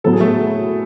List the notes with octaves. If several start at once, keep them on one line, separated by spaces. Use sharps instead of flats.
A2 F#3 B3 F#4 A4
G#4
A3 A4